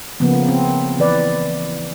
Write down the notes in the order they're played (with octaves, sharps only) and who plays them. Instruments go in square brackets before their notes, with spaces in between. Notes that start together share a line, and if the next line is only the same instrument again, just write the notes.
[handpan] C#3 F3 A#3 B3
C4
E3 B4 D5